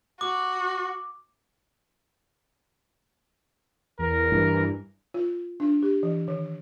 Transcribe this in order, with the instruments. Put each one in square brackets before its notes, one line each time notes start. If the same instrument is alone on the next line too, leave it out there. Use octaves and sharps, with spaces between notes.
[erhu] F#4 [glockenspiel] D6
[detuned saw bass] E2 [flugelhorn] A#4
[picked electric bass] G2 [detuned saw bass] E3
[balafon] F4
D4
G4
E3
D#3